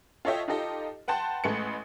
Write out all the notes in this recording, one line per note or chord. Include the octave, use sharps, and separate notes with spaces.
F4 A4 C#5 D#5 E5 G5
D#4 F4 G4 A4 D#5
B4 F#5 G5 A5 C6
A1 G#3 A3 B4 C#7